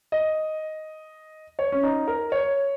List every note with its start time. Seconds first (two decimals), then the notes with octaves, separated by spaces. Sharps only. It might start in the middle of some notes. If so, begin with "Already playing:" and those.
0.12 D#5
1.59 C#5
1.72 C#4
1.83 D#4
2.08 A#4
2.32 C#5